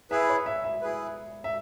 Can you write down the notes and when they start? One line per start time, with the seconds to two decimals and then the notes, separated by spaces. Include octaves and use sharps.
0.11 E4 G#4 B4 E5
0.29 C#5
0.46 E5
0.64 E5
0.82 E4 G#4 B4
1.44 E5